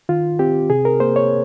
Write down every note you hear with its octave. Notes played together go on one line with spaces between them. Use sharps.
D#3 F4
C4 G4
C3 G#4
A#4
A#3 C5
C#5